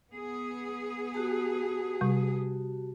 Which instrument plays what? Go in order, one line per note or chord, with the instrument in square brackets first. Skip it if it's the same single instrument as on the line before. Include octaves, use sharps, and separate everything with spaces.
[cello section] B3 G#4
[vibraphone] F#4 G4 A5
[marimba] C3 G3